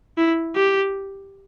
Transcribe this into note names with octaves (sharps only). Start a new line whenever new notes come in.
E4
G4